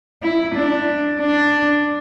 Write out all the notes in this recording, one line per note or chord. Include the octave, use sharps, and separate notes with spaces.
E4
D4
D4